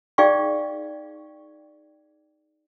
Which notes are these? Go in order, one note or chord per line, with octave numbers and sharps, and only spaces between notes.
D#4 G#4 D5 F5 G5 C#6